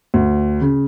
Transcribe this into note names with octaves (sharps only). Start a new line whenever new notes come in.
D2
C#3